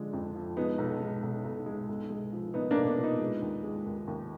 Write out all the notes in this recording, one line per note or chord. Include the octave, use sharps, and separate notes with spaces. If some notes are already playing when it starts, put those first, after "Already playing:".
Already playing: D3 F3 G#3
F2
F3
G#3 B3 D#4
B1
G#3
B1
B1
G#3
B1
G#3
F3
A#2 B3 D#4
A#3 D4
B1
B3
A#2
B3 D#4
G#3
D#2
G#3
D#2
D#2